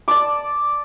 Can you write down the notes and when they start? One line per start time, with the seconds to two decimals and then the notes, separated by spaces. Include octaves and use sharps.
0.08 D5 A5 D6